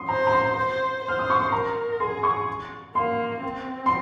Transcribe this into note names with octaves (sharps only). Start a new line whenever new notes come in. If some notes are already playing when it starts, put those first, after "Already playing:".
Already playing: C6 D#6
C5 A#5
A#5
C6
C5
C5 F6
D#6
C#6
C6
A#4 A#5
G#4 C6
C#6
A#3 C6
C4
C6